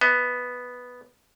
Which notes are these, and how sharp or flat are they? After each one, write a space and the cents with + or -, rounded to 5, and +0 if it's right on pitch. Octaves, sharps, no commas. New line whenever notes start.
B3 +0 D#5 +30